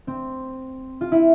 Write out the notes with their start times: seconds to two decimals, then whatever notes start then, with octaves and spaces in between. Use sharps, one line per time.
0.07 C4
1.01 F4
1.12 E4